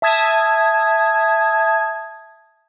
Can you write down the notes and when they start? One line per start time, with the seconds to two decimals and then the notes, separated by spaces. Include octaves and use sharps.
0.02 E5 A5 D#6 G#6